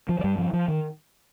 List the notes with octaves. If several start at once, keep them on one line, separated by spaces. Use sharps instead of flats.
F3
F3
G2 G3
F3
F3
D#3